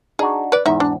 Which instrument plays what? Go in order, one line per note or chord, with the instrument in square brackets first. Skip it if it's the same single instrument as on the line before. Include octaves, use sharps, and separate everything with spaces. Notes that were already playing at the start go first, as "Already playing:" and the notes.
[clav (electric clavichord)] D4 D#4 F#4 [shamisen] G#4
[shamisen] B4 D5
[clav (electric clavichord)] E2 G#2 [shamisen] D#4 E5
[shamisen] D4